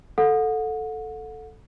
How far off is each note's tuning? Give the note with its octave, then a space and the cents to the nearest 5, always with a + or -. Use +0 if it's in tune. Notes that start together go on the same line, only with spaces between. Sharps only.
A4 +0 F#5 -30